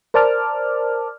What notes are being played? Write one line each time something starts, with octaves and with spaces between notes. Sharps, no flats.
A#4 C5 D5 A5 D6 F6